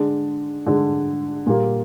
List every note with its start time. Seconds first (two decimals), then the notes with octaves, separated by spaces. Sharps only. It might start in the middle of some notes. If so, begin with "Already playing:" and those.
Already playing: D3 G#3 D4
0.66 D3 G#3 D4
1.46 A#2 G3 A#3